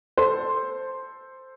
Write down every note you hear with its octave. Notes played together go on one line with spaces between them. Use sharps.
A4 C5